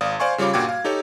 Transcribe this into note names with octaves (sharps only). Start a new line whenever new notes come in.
G#1 D5 F5 D#6
C5 D5 F5 G#5 C6 C#6
C#3 G3 F4 C#5 D6
G2 A#2 F#4 G5 D6 G#6
F5
D#4 G4 A4 C#5